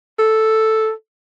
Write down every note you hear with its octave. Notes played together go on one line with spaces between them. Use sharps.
A4